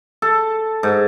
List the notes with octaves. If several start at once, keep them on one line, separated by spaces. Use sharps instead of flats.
A4
G#2